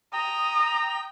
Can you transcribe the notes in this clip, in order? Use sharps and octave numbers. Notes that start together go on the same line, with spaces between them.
G5 A#5 D#6